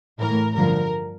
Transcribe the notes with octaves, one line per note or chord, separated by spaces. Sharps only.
A2 E3 A#4
G2 D3 F3 A#4